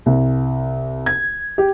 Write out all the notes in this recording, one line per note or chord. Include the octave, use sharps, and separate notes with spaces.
C2
G#6
G4